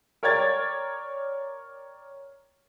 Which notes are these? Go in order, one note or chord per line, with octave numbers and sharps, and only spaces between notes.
A#4 C#5 D5 G5 G#6 A6